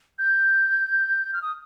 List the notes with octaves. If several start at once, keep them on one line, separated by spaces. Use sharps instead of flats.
G6
F6
D#6